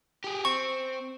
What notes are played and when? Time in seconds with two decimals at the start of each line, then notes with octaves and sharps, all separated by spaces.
0.24 G4 G#4
0.45 C4 C#6